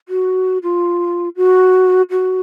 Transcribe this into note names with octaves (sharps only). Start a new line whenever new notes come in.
F#4
F4
F#4
F#4